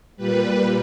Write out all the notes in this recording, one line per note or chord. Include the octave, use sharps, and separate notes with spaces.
A#2 G3 B4